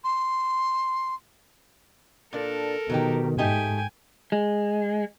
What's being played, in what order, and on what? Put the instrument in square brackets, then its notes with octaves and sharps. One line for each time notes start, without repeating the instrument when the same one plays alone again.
[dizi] C6
[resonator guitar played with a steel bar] A#2 D4 [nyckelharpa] A4 A#4
[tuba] B2 [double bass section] D#3 [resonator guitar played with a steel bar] F#3 D#4 G4
[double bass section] G#2 [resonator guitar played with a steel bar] A3 D#4 G4 [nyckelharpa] G5 G#5
[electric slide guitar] G#3